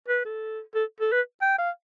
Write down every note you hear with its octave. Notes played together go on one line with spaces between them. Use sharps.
B4
A4
A4
A4
B4
G5
F5